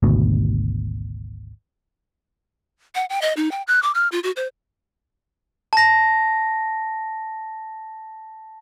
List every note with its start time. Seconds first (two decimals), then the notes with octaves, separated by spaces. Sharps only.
0.03 G#1 D2 B2
2.95 F#5
3.10 G5
3.22 D#5
3.37 D#4
3.51 G5
3.68 F#6
3.83 D6
3.95 F6
4.12 F4
4.23 F#4
4.36 C5
5.73 A5 A#6